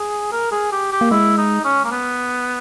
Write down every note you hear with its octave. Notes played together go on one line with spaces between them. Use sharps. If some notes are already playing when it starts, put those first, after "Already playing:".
Already playing: G#4
A#4
G#4
G4
G4
A#3
G#3 E4
D#4
C#4
A#3
B3